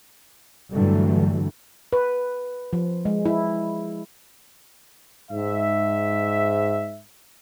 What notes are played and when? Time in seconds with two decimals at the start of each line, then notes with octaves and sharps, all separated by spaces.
0.72 G2 D3 E3 F#3 G3 A3
1.93 B4
2.73 F3
3.05 G#3
3.25 E4
5.32 G#2 E5